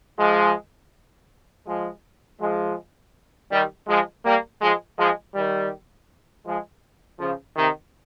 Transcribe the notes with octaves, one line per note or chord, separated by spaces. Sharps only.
F3 G#3
F3 G#3
F3 G#3
D#3 G3
F3 G#3
G3 A#3
F3 G#3
F3 G#3
D#3 G3
F3 G#3
C#3 F3
C3 D#3